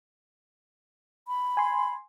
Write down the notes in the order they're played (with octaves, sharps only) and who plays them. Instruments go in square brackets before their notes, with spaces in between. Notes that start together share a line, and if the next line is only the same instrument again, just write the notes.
[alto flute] B5
[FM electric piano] G#5 C6